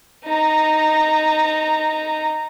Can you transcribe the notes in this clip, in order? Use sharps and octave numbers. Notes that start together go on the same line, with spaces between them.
D#4 A#5